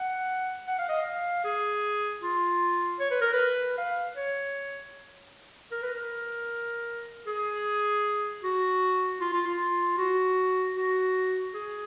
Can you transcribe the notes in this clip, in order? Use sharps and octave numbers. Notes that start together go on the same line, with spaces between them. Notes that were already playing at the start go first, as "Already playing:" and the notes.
Already playing: F#5
F#5
F5
D#5
F5
G#4
F4
C#5
B4
A#4
B4
F5
C#5
A#4
B4
A#4
G#4
F#4
F4
F4
F4
F#4
F#4
G#4